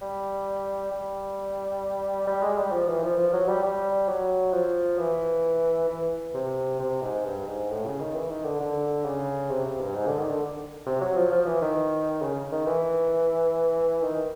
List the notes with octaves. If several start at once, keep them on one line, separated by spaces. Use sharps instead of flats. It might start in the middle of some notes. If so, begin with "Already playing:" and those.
G3
G3
G3
G#3
G3
F3
E3
F3
F3
F#3
G3
G3
F#3
F3
E3
E3
C3
C3
G#2
G2
G#2
A2
C#3
D#3
E3
D#3
D3
D3
C#3
C3
C3
G2
G#2
D3
D#3
D3
C3
F#3
F3
F3
E3
D#3
C#3
D#3
E3
D#3